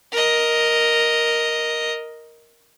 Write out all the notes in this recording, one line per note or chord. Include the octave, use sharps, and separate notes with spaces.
A#4 D#5